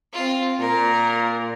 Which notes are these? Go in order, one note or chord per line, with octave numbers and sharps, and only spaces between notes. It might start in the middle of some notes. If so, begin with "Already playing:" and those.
C4 F4
A#2 A#4